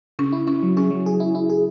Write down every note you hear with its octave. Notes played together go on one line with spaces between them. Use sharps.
C#3 C#4
E4
C#4 E4
F#3
C#4 G#4
F#3
G#4
E4
E4
G#4